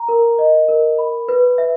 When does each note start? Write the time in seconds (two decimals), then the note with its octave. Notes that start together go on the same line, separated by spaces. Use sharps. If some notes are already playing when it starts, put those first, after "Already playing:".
Already playing: A#5
0.09 A#4
0.39 D#5
0.68 A#4
0.98 B5
1.29 B4
1.58 E5